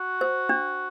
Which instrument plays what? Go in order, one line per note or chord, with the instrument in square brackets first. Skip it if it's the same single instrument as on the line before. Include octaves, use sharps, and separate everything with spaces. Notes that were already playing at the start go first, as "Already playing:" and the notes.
Already playing: [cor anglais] F#4
[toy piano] C5
D4